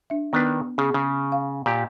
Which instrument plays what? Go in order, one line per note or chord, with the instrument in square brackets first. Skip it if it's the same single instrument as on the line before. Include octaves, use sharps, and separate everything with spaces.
[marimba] D4 E5
[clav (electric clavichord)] D#3 D4 B4 [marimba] B3
[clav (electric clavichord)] C#3 [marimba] G#4
[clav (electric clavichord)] C#3
[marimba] F5
[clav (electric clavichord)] A#2 G4